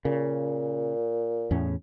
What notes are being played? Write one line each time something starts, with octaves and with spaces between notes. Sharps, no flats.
A#2 C#3
E2 A2 C#4